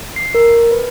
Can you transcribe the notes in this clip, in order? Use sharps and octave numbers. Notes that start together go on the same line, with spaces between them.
C7
A#4
B4